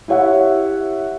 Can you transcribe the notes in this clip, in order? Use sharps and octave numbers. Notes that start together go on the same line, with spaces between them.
E4 G4 C#5 E5 F#5